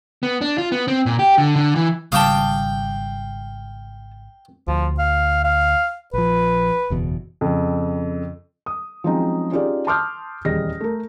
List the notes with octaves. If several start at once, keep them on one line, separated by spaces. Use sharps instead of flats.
B3
D4
F4
B3
C4
A#2
G4
D3
D3
E3
G#1 C#3 G3 F5 G5 A5 D6 D#6
D2 F3
F5
F5
A#1 F3 B4
F#1 E2 B2
F2 C#3
D#6
F3 F#3 G#3 C4 C#4 D#4
C#4 D#4 F4 G4 G#4 D5
A5 C6 D6 D#6 F6 G6
D#1 E2 G3 G#4 D#5 A#6
A3 A#4